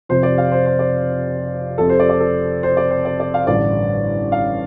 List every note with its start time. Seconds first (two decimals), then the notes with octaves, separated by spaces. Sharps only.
0.09 F1 F2 C3 C5
0.23 D5
0.38 F5
0.52 C5
0.66 C5
0.79 D5
1.78 F1 F2 C3 A4
1.89 C5
2.00 D5
2.10 D5
2.20 A4
2.63 C5
2.77 D5
2.91 C5
3.05 D5
3.20 D5
3.34 F5
3.47 A1 G2 D3 D5
4.32 F5